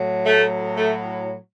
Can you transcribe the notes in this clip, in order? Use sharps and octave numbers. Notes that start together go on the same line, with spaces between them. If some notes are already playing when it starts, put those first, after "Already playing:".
Already playing: A2 F#3
A3
A3